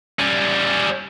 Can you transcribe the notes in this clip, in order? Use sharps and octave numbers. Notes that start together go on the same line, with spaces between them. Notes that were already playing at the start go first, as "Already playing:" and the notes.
G3 C#4